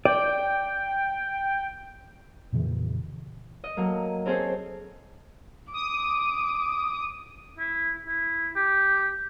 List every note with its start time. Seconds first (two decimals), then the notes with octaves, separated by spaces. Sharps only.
0.05 D5 G5
2.52 F2 A#2 C#3 E3
3.64 D#5
3.77 F#3 A3 A#3
4.26 C4 C#4 G#4 A4 C5
5.73 D6 D#6
7.59 E4
8.07 E4
8.56 G4